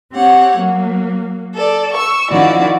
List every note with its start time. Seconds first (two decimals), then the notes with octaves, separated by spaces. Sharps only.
0.12 C4 G4 C#5 F#5
0.56 F#3 A#3
1.54 A4 D5
1.92 C#6 E6
2.30 D#3 F3 C#4 E4 F#4 D5